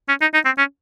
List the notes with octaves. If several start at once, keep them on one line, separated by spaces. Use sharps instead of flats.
C#4
D#4
D#4
C4
C#4